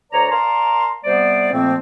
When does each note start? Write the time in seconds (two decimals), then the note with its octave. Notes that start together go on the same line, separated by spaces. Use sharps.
0.12 D2 B4 C#5 D5 A#5
0.31 A#4 D5 F5 A5 A#5 C6
1.04 C3 G3 B3 C5 D5
1.52 F2 A#2 F3 A3 A#3 C4